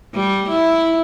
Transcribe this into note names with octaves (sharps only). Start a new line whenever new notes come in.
G3
E4